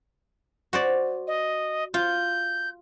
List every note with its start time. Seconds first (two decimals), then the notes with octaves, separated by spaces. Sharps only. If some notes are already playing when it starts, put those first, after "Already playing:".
0.73 F#4 C5 D5
1.27 D#5
1.94 F4 G6